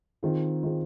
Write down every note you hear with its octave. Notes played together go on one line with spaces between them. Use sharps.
D#3 C4 F4 G#4
D#3 C4 F4 G#4